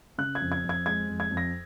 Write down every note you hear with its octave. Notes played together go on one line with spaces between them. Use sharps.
C#3 F#6
G#6
F2
G#6
F2
G#6
G#3 G#6
F2
G#6
F2
A#6